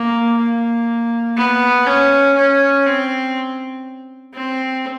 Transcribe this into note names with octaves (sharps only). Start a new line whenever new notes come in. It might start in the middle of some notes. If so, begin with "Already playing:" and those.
Already playing: A#3
A#3
B3
C#4
C#4
C4
C4